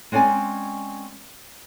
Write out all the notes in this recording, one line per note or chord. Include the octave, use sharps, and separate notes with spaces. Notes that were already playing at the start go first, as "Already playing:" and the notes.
G#3 C4 C#4 D5 G#5